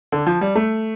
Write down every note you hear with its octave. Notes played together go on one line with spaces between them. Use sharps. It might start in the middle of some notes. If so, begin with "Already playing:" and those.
D3
F3
G3
A3